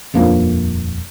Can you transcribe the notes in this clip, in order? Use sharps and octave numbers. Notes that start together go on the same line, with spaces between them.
D#1 F2 A#3 D4